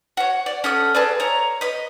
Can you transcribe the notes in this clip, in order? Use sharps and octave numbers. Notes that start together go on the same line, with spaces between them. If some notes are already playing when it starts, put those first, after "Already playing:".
F#4 C#5
D5
C#4 A4 F#5 D#6
G#4 A4 B4 D5
C#5 A#5
B4 D#5